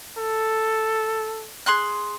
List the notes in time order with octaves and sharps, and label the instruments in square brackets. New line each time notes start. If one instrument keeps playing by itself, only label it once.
[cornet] A4
[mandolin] G#4 C6 F#6